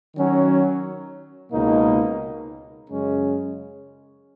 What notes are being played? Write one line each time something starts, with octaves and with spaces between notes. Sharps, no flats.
D#3 F#3 C#4 F#4
C#2 B2 A#3 D#4
F#2 C#3 G#3 C#4